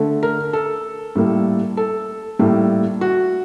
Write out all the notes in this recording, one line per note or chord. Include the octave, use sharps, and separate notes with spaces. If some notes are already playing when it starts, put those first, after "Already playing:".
Already playing: D3 A3
A#4
A4
A2 G3 A#3
A4
A2 G3 A#3
F#4